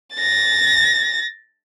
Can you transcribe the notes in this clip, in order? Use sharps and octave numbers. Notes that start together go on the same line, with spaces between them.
A6 A#6